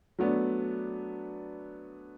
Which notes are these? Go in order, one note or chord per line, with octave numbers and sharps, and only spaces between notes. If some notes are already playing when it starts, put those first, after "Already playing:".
F#3 A3 B3 D4